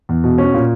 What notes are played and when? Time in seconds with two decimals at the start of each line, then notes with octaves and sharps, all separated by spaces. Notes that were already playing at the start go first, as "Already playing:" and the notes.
0.09 E2
0.24 B2
0.38 C#4
0.54 A#2